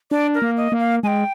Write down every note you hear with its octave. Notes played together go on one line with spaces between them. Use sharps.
D4 D5
A#4
A#3
D#5
A#3
F5
G#3 G5 G#5